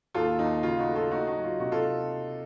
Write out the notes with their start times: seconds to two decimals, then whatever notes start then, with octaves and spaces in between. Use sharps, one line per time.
0.14 D#2 F4 A4
0.39 D#2 D#4
0.63 C#3 F4
0.79 D#4 F#4
0.87 A3
0.95 F4 A4
1.11 A3 D#4 F#4
1.27 D#4 F#4
1.35 F#3
1.44 F4
1.60 C3 D#4 F#4
1.71 F4 A4